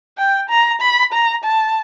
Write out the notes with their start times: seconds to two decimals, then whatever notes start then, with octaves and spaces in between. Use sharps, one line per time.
0.18 G5
0.49 A#5
0.81 B5
1.13 A#5
1.44 A5